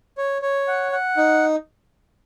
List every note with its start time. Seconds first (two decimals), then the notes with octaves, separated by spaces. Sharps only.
0.18 C#5
0.42 C#5
0.68 F#5
0.92 F#5
1.17 D#4